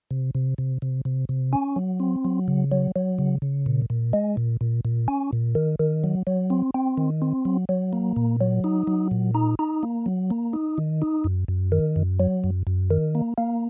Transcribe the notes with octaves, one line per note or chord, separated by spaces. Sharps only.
C3
C3
C3
C3
C3
C3
C#4
F#3
C4
F#3
C#3
F#3
F#3
C#3
C#3
A#2
A#2
G#3
A#2
A#2
A#2
C#4
A#2
D#3
D#3
F#3
F#3
C4
C4
D#3
C4
F#3
F#3
A#3
A#2
F#3
D#4
F#3
A#2
D#4
D#4
A#3
F#3
A#3
D#4
D#3
D#4
F#2
F#2
D#3
F#2
F#3
F#2
F#2
D#3
A#3
A#3